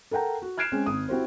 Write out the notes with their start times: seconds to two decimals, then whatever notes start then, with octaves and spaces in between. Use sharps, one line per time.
0.11 A4 A#4 F#5 G5 A#5
0.42 F#4
0.58 F6 F#6 G#6 C7 D7 E7
0.72 G#3 C4 C#4
0.86 G#1 D#6
1.09 C4 E4 F#4 G4 C5